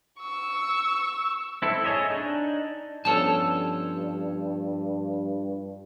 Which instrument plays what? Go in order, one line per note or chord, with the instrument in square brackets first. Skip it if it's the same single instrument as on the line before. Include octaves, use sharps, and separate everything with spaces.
[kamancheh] C#6 E6
[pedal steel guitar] C4 E4 A4
G#4 A4 C#5 D#5 E5
D4 D#4
[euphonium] G2 [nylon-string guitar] F3 B3 C#4 [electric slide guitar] A4 C#5 A5